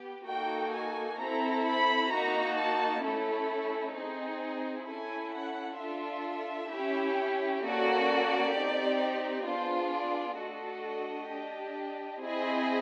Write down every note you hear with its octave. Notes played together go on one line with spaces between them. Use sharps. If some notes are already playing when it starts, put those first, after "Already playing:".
Already playing: B3 G4
A#3 D#4 F#4 A4 G5
G#5
C4 E4 A4 A#5
B5
A#3 D#4 F#4 A#5
A5
A3 C#4 E4 A4
C4 D#4 G#4
C#4 E4 A4 G#5
F#5
D4 F4 A4 E5
C#4 E4 G4
A#3 C#4 F#4 A4 D5
C4 D#4 G4
B3 D4 F4 G#4 C5
D5
A3 D4 F#4 A4 D#5
D4 G4
C4 E4 G#4 D#5